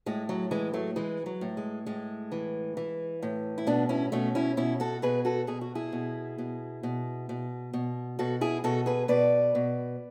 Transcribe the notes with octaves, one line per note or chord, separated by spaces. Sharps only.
A2 G#3
F#3
E3 G#3
F#3 A3
E3 G#3
F#3
A2
G#3
A2 G#3
E3
E3
A2
E4
B2 B3 D4
C#4 E4
B2 A3 C#4
C#4 E4
B2 C#4 E4
F#4 A4
B2 G#4 B4
F#4 A4
B2 G#4
F#4
E4 G#4
B2
B2
B2
B2
B2
B2 F#4 A4
E4 G#4
B2 F#4 A4
G#4 B4
B2 B4 D5
B2